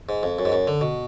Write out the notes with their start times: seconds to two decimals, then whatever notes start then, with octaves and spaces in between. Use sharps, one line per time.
0.09 G#2
0.23 F2
0.39 F#2
0.45 G#2
0.52 F#2
0.67 D3
0.81 B2